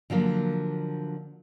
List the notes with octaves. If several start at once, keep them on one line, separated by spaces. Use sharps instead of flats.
D3 F3 F#3 A#3